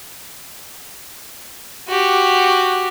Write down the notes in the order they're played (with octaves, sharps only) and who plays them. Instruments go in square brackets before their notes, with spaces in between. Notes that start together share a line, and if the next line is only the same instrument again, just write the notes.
[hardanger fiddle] F#4 G4